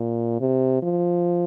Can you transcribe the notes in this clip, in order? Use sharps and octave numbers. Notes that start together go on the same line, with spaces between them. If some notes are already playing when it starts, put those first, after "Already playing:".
Already playing: A#2
C3
F3